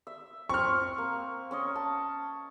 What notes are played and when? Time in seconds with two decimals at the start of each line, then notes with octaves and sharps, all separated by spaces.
0.07 E5
0.49 C4 C#6 F6
0.98 A#3
1.51 C#4 C#5 D#5
1.76 A5